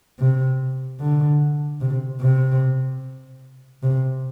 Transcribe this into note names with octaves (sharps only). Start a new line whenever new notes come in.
C3
D3
C3
C3
C3